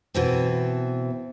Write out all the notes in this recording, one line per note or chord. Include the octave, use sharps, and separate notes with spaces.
B2 E3 C4